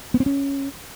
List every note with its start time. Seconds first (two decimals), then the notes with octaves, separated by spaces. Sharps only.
0.14 B3
0.20 C4
0.26 C#4